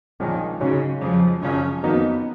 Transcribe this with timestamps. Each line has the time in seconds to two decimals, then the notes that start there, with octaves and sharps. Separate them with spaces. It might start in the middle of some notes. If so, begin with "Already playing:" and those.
0.20 A#1 A#2 D#3 F3 G#3 C#4
0.60 G#2 C#3 F#3 C#4
1.01 F2 C#3 F3 G#3
1.42 G#1 F#2 C#3 F3 C#4
1.83 F2 D#3 F#3 A#3 B3 D#4